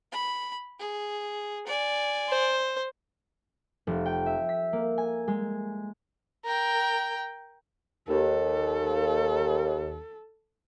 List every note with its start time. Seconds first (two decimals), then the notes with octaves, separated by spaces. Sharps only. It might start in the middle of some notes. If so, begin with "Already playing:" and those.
0.12 B5
0.79 G#4
1.67 D5 G#5
2.29 C5
3.87 F1
4.06 G5
4.26 E5
4.49 B6
4.73 A#3
4.98 G#5
5.28 G#3
6.45 A#4 G5
8.08 D#2 A4